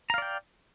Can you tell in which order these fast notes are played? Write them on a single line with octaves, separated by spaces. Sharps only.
A#5 F5 D5 G5